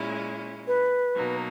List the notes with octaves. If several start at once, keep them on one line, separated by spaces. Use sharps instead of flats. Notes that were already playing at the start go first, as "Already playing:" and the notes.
Already playing: A#2 G#3 C#4 E4
B4
B2 F#3 A#3 D#4